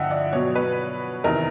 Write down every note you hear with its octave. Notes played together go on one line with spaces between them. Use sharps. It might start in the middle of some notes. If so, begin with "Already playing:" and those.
Already playing: G2 D3 F3 D#5 E5 F#5 G5
D5
B2 F#3 C#5
B4
E2 C3 D#3 A#4